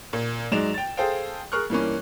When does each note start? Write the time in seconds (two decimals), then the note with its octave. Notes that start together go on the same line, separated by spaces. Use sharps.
0.13 A#2
0.51 G#2 F#3 G#3 D5 E7 F7
0.74 G5 A6
0.97 G#4 A4 C5 F5 G5
1.52 G#4 A#4 C#6 F6 F#6
1.70 G2 E3 A#3 C#4